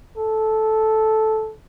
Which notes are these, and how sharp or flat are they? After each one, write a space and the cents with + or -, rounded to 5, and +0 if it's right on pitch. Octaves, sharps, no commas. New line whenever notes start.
A4 -10